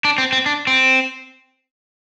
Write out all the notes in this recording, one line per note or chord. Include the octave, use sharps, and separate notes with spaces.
D4
C4
C4
D4
C4